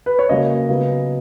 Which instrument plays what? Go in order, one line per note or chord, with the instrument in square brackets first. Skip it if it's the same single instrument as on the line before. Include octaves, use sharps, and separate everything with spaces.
[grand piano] B4
C#5
C#3 F#3 A#3 D#5
C#3 F#3 B3